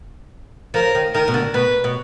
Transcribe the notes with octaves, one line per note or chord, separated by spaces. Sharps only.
F3 A#4
D#3
D#3 A#4
B2
D3
B2 B4
B2